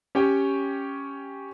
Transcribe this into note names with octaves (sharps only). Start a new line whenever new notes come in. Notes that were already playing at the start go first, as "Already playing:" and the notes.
C#4 G4 C#5 G5